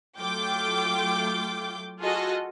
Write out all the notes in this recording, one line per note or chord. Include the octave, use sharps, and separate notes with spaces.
F#3 A3 F4 G5 D6 G6
F4 F#4 G#4 A4 D#5